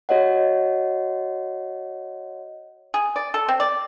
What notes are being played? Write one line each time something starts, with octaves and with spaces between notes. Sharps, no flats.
F#4 C#5 D#5 F#5
G#4
D5
A4
C4
D5